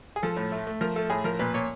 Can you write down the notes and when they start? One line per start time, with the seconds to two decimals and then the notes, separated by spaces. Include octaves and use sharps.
0.16 G#4
0.23 F3 A4
0.37 A2
0.52 A3
0.67 A3
0.81 F3 A#4
0.96 A3 A4
1.10 A2 G#4
1.24 F3 A#4
1.39 A#2 B4
1.54 A#2 C#5